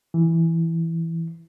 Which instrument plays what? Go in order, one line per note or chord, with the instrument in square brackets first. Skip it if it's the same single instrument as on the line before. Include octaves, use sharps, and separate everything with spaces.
[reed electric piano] E3